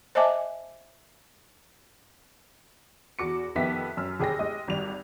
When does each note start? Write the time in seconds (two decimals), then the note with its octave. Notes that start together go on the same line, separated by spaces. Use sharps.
0.15 C5 D#5 E5 G#5 A5 D6
3.19 E2 F#4 D6 C#7
3.55 F2 D#3 B3 G4 E5 B6
3.97 F#2 E6 F6
4.20 G1 G4 G#4 G5 D#6 A#6
4.39 G#3 G4 D#5
4.68 G#1 G3 F7